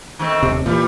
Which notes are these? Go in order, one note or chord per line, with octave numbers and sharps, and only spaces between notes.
D#3 A3 C4
D#1 C3
A#2 E3 G3